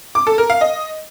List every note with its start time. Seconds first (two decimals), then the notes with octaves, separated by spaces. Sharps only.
0.15 D6
0.27 A4
0.38 A#4
0.50 F5
0.61 D#5